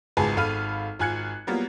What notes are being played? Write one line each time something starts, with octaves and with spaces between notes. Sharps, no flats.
G#1 C#2 G#3 B4 G#5 A5
G#1 A4 F5 B5 F6 D#7
G#1 F4 G#5 F#6 G#6 C#7
F#3 G3 A#3 B3 F4